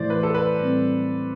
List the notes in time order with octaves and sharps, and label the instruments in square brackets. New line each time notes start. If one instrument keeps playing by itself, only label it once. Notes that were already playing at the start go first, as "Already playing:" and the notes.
Already playing: [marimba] A2 E3 A3 E4 [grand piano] C5 D5
[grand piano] B4
A4
B4
[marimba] A2 G3 C4